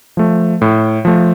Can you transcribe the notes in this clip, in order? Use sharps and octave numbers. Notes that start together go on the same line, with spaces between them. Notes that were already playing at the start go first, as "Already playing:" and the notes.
F3 A3
A2
F3 A3